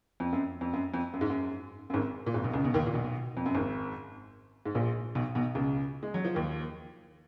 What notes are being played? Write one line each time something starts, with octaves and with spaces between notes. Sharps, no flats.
F2
F#2
F2
F#2
F2
F#2
G#2
F#2
F#2
G#1 G#2
A#2
G#1 G#2
B1 B2
C#2 C#3
B1 B2
D#2 D#3
A#2
B1 B2
F2
F#2
G#1 G#2
G#2
A#1 A#2
B1 B2
B1 B2
C#2 C#3
G#3
F#3
F3
D#2 D#3